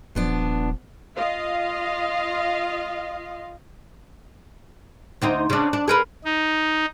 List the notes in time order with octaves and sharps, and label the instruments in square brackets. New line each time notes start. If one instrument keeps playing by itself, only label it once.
[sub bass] D#1 [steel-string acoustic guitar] F3 B3 D4
[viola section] F4 D#5 F5
[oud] D2 C4 D#4
C#3 D4
D4
G#4 A#4 B4
[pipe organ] D#4